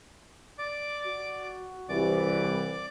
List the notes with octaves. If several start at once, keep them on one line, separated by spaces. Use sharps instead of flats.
D5 D6
F#4
C2 E3 D5 D6